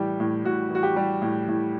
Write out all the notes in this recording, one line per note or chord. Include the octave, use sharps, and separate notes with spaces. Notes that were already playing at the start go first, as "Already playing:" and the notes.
Already playing: A2 E3 G3 G4
A2
A2 F#4
E3 F#4
G4
G3
A2
A2